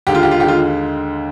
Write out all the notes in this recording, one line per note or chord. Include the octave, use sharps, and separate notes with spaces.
D#2 D3 G#3 G4
F4
G4
F4
D#2 D3 G#3 G4
F4